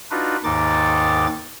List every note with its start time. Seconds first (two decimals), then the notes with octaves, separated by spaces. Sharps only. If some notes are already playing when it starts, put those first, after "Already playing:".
0.11 D4 D#4 F4 F#4 B4
0.44 D#2 G#2 D#3 D#4 D6 A6